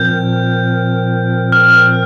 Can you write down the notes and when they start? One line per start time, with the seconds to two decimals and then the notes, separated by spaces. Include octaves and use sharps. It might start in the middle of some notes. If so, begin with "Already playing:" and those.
Already playing: A#2 F3 C4 A#4 G6
1.52 F6